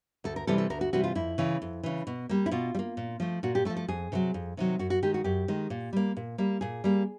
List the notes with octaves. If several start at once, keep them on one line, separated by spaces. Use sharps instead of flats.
D2 A4
A#4
C3 E3 G3 A4
A4
D2 A#4
F#4
C3 E3 G3 F#4
F4
F2 E4
C#3 E3
F2
C#3 E3
B2
G3 A#3
E4
B2 F4
G3
A#3
A#2
F3 A3
A#2 F#4
G4
F3 A3 A4
A4
F2 G#4
C3 D#3 F#3
F2
C3 D#3 F#3
F#2 F#4
F#4
D#3 G#3 G4
F#4
F#2 G4
D#3 G#3
A#2
G3 A#3
A#2
G3 A#3
A#2 G#4
G3 A#3